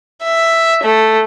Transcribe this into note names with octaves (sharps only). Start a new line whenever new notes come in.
E5
A3